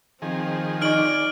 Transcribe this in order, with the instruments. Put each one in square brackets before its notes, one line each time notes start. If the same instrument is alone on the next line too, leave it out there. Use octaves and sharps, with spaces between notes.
[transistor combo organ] D#3 F3 G#4 [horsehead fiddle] C4
[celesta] D#4 D#5 C#6 [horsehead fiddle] D5 [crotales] F6 D7 F#7